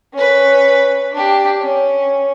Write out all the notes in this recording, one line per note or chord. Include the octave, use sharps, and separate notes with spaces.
C#4 B4
D4 G4
C#4